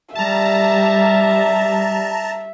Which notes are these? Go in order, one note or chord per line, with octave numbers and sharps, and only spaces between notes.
G3 E5 A5 A#5